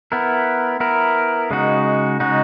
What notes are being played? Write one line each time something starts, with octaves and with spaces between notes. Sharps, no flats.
B3 E4 A#4
B3 E4 A#4
C#3 G#3 D#4 F#4
C#3 G#3 D#4 F#4